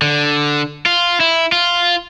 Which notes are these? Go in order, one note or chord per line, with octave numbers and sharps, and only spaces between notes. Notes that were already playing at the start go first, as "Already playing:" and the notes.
D3
F4
E4
F4